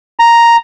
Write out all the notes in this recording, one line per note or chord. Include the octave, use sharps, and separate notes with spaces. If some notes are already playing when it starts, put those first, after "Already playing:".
A#5